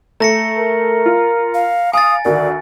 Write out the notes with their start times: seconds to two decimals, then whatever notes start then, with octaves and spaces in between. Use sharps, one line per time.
0.20 A3 A#5 A#6 C#7
0.58 A#4
1.06 F4
1.54 F5
1.93 F5 G#5 D#6 A6
2.25 D2 D#3 D5